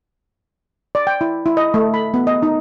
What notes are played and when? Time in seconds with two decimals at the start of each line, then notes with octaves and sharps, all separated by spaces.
0.95 D5
1.07 G5
1.21 E4
1.46 E4
1.57 D#5
1.74 A3
1.94 B5
2.14 B3
2.27 D#5
2.43 D#4